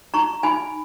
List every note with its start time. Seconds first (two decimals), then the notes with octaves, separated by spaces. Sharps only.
0.14 D#4 A#5 C#6
0.43 D#4 G#5 B5